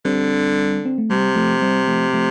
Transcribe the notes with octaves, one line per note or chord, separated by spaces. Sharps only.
D3 G3 C4
C4
A3
C3 G3
F3 A3
G3 C4
F3 A3
F3 A3